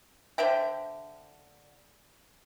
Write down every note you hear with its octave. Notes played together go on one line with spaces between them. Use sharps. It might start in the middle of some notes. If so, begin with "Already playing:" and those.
D3 C5 E5 G5